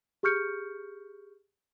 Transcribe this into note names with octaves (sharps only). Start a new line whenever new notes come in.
G4 G#4 C#6 F6 G6 C#7